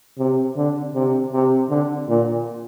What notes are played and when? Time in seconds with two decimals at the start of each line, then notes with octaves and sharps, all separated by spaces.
0.18 C3
0.56 D3
0.94 C3
1.33 C3
1.70 D3
2.09 A#2